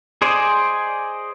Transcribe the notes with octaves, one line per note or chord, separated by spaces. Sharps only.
G#4 C5 D5 D#5